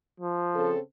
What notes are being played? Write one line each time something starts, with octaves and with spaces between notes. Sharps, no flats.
F3
C#3 C4 A4